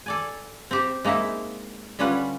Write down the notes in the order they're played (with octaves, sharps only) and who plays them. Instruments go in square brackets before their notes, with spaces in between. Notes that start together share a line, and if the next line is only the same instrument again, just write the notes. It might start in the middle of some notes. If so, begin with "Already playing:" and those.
[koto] A4 D5 G#5
C4 G4 C5
G#3 A#3 D#4 E4 E5
D3 G3 C#4 F4 B4 F#5